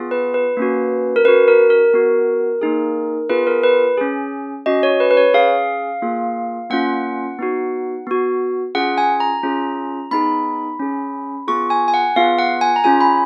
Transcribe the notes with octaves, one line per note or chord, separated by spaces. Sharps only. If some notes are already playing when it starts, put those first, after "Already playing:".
Already playing: B3 F4 G#4
B4
B4
A#3 C#4 F#4
A#4
C#4 F#4 B4
A#4
A#4
B3 F#4
A#3 D#4 G#4
B3 F4 G#4 B4
A#4
B4
C#4 G#4
C#4 F#4 D#5
C#5
B4
B4
C#5
C#4 G#4 F5
A#3 F4 G#4
A#3 C#4 F4 F#5
B3 D#4 F#4
B3 F#4
C#4 F4 G#4 F#5
G#5
A#5
C#4 F4 G#4
B3 D#4 G#4 B5
C#4 G#4
B3 F4 G#4 C#6
G#5
G#5
F#5
B3 F4 G#4 F5
F#5
G#5
A#5
C#4 F4 G#4 G#5
B5